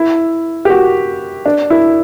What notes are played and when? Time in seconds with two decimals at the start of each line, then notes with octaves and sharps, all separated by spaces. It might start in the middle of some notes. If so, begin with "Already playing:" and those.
Already playing: E4
0.65 G4
0.70 F#4
1.46 D4
1.70 E4